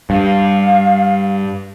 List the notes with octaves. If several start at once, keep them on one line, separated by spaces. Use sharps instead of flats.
G2 F5